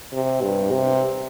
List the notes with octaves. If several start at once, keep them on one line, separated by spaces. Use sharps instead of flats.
C3
G2
C3